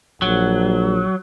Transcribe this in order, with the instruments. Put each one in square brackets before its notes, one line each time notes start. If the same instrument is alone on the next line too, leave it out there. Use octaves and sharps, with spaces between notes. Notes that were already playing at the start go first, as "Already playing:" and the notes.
[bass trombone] A#1 [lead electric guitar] F#3